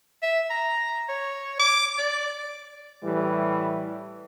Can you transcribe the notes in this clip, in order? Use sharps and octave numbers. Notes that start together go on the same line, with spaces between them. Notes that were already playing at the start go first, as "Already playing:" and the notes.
E5
A#5
C#5
D6
D5
A2 E3 G3